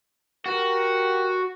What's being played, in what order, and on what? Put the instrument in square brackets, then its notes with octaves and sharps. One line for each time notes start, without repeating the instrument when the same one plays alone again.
[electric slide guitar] F#4 [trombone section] G4 A#4